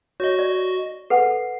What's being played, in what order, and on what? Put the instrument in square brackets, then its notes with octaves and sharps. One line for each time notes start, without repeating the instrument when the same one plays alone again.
[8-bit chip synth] F#4 D#5 [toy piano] C#5
[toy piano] D5
[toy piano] A4 B4 F#5 [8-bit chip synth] C7